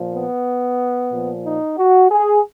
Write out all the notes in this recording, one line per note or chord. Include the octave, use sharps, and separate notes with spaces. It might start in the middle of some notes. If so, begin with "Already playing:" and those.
Already playing: A#2 F3
B3
A#2 F3
D#4
F#4
G#4